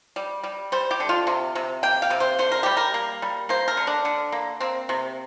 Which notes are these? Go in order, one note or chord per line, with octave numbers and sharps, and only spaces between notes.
G3
G3
G3 C5
G4
D3
F4
C3
C3
A#3 G5
F5
C3
C5
D3 C5
A#4
G3 G4
A#4
A#3
G3
A#3 C5
A#4
D3
D4
D3
A#3
A#3 C4
C3